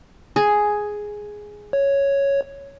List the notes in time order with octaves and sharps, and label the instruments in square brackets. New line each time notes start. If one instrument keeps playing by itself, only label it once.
[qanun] G#4
[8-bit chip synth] C#5